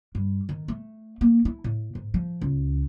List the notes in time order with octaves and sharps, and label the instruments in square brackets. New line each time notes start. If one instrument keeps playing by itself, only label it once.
[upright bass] G2
D#3
A3
A#3
E4
A2
G#2
F3
C#2